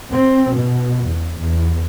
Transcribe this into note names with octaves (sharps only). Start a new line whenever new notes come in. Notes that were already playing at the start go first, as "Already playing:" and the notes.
C4
B2
E2
E2